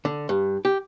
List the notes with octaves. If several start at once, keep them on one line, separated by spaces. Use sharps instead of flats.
D3
G2
G4